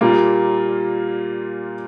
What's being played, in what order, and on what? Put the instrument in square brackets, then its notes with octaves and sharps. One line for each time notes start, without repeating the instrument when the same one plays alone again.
[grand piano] A#2 G3 A#3 F4